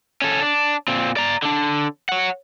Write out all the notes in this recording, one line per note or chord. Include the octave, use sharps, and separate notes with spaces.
C#4 A4
D4
A#2 C4
D5 A#5
D3 D4
C#5 F#5